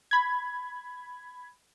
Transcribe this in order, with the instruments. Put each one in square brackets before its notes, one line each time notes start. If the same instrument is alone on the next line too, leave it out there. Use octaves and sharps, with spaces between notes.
[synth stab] B5 G#6